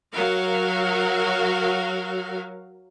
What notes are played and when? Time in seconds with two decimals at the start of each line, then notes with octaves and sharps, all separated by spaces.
0.12 F#3 F#4 A#4 F5